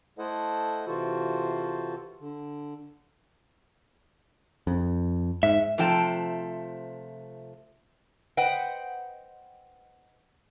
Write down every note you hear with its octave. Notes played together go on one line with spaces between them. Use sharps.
A3 E4 A4 C5 D#5 F#5
C3 E3 F4 F#4 A4 C5
D3
F2
G#2 E5
C3 F3 A3 G5 A5
B4 C5 D#5 F#5 G5